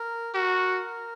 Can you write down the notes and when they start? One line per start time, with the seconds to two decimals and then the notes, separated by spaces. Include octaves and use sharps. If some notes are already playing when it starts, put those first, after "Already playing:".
Already playing: A#4
0.35 F#4 A#4